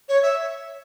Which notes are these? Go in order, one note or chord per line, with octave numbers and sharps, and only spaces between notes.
C#5
E5